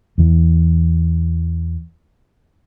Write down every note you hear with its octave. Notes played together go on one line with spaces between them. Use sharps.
E2 E3